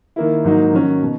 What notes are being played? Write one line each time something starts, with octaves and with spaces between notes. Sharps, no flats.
D#3 A#3 E4
G#2 F#3 A#3 D#4
D#3 F#3 C#4 F#4
B2